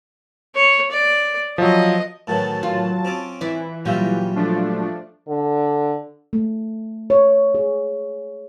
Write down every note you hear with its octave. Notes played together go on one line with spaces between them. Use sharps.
C#5
D5
F3 F#3 D#5
A2 D#3 E3 F#3 A5
F4
C4 C#4 D6
E3 E4 D5
A#2 F#3 G3 C#4 F4 E5
F3 A3 D4
D3
A3
C#5
G#4